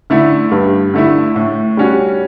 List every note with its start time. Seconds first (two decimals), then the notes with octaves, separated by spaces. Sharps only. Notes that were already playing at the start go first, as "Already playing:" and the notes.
0.10 D3 A3 E4
0.52 G2
0.94 D3 A3 E4
1.36 A2
1.77 G3 C#4 F#4